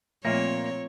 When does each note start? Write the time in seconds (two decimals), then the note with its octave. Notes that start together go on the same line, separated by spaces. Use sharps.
0.25 A#2 F3 A3 A#3 C4 C#5 E5